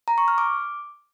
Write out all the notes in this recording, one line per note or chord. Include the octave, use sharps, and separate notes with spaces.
A#5
C#6
F6
D6